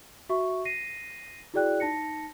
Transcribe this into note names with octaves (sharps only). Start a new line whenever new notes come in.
F#4 E5 C#6
A#6 C7 D#7
E4 F#4 G#4 D5 G5 F#6
D#4 A5 A#6 C#7